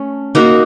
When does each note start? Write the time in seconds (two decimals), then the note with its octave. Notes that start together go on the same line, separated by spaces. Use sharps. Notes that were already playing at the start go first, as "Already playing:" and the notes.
Already playing: A3 C#4
0.35 A#3 D#4 F#4 A#4